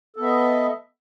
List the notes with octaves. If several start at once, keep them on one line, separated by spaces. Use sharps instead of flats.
B3 A4 D#5 E5